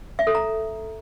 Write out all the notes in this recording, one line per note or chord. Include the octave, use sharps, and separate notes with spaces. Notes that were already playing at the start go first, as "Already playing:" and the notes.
E5
A4
A#5